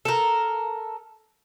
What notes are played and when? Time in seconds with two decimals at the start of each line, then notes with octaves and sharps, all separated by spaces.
0.05 A4 A#4